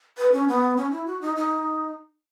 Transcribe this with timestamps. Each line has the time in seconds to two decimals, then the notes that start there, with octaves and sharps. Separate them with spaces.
0.18 B4
0.32 C#4
0.48 B3
0.77 C#4
0.91 E4
1.06 F#4
1.21 D#4
1.36 D#4